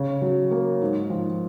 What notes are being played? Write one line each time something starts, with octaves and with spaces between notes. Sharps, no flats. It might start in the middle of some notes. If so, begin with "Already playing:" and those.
Already playing: C#3
F#3
A#3
G#2
F3